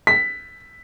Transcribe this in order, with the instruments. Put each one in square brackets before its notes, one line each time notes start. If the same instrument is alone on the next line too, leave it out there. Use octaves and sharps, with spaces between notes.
[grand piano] B6